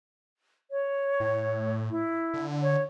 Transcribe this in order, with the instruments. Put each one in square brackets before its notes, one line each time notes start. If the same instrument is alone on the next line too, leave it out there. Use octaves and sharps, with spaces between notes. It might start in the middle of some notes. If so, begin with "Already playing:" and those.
[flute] C#5
[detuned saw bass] A2
[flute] E4
[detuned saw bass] D3
[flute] C#5